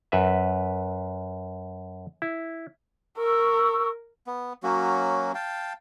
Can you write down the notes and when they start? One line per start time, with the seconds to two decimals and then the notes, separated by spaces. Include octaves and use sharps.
0.12 F#2 B4 E5
2.22 E4
3.18 A#4 C#6 E6
4.27 B3
4.63 F#3 A#3 C#4 F#4
5.35 F5 G5 A5